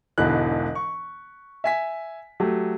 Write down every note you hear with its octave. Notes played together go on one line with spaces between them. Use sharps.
E1 G#2 B2 D3 E3 F#6
C#6
E5 G#5 B6
F#3 A3 G4